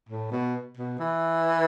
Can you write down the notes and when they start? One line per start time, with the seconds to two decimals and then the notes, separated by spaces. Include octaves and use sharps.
0.09 A2
0.32 B2
0.77 B2
0.99 E3